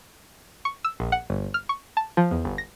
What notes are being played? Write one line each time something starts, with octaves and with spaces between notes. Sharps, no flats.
C#6
E6
A#1
F#5
G1
F6
C#6
A5
F3
E2
G1
A#6